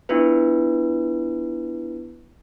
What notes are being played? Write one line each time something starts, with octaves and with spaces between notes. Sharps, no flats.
B3 D4 E4 F4 B4